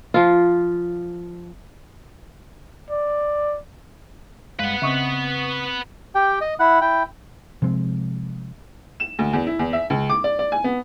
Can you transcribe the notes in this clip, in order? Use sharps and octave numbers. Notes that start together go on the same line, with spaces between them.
F3 F4
D5
G2 G#3 B4 F5 F#5
C#3 C4 D#5 E5 C#6 D#6
G4 G5
D#5
E4 F#5
E4 G5
C3 F3 G#3 C4
E7
D2
E2
E4
E2
E5
C#2
D6
D5
D5
G#5
B3